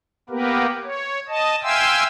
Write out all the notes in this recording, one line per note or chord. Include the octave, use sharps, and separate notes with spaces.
A#3 B3 G4 A#4 B4
C#5
D#5 A5
E5 F5 G5 G#5 C6 E6